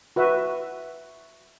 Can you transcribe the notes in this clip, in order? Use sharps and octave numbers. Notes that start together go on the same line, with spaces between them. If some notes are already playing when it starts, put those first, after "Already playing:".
F#4 B4 E5